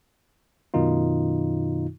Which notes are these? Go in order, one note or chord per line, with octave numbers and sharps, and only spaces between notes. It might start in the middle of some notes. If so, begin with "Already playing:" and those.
F#2 B2 D#3 D#4 F4